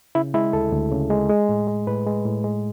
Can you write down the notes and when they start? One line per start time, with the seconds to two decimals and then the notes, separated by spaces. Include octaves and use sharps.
0.15 C#3 E4
0.34 G#3 E4
0.53 D2 A4
0.73 D2
0.91 C#3
1.10 G#3
1.29 G#3
1.49 A2
1.67 G#3
1.87 A2 B4
2.06 G#3
2.25 A2
2.44 G#3